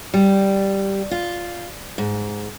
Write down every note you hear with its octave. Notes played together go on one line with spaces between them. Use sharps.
G3
F4
G#2